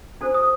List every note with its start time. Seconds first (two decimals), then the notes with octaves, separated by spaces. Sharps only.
0.21 D4 F#4 A4 C5
0.34 D#6